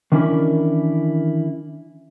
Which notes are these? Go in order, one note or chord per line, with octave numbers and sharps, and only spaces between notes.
D#3 E3 C#4 D4 E4 A#4